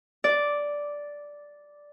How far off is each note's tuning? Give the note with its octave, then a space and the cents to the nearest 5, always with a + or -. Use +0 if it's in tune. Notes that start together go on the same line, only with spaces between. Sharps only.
D5 -5